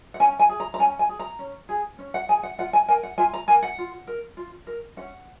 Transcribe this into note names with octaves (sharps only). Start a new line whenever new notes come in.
F#5
C#4 G#5
G#5
G#4
A#5
A#5
C#4 G#5
G#5
G#4
A#5
C#4
G#4
C#4
F#5
G#4 G#5
F#5
F4 F#5
G#5
A#4 G#5
F#5
F4 G#5
A#5
A#4 G#5
F#5
F4
A#4
F4
A#4
C#4 F#5